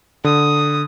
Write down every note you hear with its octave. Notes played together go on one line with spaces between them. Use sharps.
D3 D#6